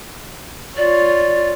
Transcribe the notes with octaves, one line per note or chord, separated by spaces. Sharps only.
F4 C#5 D5